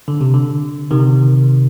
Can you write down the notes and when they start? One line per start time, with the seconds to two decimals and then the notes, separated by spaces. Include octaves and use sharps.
0.08 D3
0.21 C3
0.34 D3
0.91 C3 D#3